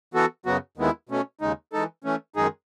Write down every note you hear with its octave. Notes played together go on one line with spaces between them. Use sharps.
E3 B3 F#4 A4
F#2 C#3 F#3 B3 F#4
D#2 D#3 G#3 B3 E4
B2 A3 C#4
D#2 C#3 G#3 D#4
E3 G#3 D#4 A4
E3 A3 C#4
F#2 D#3 G#3 D#4 G#4